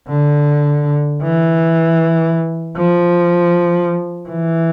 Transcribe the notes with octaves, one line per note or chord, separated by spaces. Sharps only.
D3
E3
F3
E3